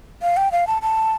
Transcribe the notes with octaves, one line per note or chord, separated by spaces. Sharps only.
F5
G5
F5
A5
A5